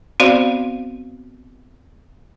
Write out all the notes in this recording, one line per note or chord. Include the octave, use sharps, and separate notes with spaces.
B3 C4 F#4 C5 D5 F5